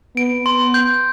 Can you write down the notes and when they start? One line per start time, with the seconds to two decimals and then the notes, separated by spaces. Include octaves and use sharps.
0.17 B3 D7
0.46 C6
0.74 G6